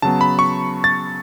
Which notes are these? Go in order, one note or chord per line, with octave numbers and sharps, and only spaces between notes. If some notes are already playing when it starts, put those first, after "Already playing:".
C#3 F#3 B3 A5
B5
C#6
A6